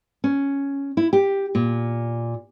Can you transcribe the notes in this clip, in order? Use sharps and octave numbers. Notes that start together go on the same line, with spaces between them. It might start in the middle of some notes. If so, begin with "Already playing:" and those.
C#4
E4
G4
A#2